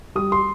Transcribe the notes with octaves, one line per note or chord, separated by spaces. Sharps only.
G3 D#6
C6